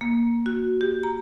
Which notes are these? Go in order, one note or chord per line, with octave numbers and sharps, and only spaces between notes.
A#3
F#4
G4
A#5